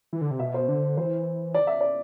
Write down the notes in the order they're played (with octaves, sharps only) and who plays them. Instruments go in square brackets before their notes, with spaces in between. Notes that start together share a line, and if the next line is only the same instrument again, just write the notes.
[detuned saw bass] E3
D3
C3
[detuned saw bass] B2 [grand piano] E5
[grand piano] C5
[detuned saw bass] D3
[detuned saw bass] E3 [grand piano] C5
[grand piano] D5
E5
D5